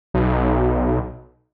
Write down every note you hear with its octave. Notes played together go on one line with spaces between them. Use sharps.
B1